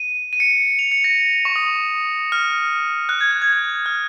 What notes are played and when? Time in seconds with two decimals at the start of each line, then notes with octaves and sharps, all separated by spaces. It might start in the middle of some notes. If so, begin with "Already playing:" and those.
Already playing: D#7
0.33 D#7
0.40 C#7
0.79 F7
0.92 C#7
1.04 A#6
1.45 C#6
1.56 D#6
2.32 F6
3.09 F#6
3.21 G#6
3.31 F#6
3.42 G#6
3.53 F#6
3.86 F6